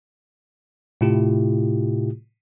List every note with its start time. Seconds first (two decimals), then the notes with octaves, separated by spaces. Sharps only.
1.01 A2 C3 A3 E4 F4 G4